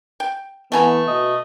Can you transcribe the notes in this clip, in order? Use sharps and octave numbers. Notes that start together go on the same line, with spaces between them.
G5
E3 A3 B3 G#5 A#5
B2 D#5